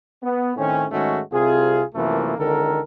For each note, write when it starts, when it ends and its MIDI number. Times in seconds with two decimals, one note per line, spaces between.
0.22 0.51 59
0.56 0.85 45
0.56 0.85 51
0.56 0.85 60
0.56 0.85 61
0.91 1.20 44
0.91 1.20 51
0.91 1.20 56
0.91 1.20 57
0.91 1.20 61
0.91 1.20 66
1.31 1.81 36
1.31 1.81 48
1.31 1.81 65
1.31 1.81 68
1.94 2.32 42
1.94 2.32 48
1.94 2.32 52
1.94 2.32 53
1.94 2.32 57
1.94 2.32 58
2.38 2.79 37
2.38 2.79 50
2.38 2.79 51
2.38 2.79 69
2.38 2.79 70